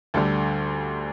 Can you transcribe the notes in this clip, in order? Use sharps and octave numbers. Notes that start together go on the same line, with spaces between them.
D2 D3 G3 A4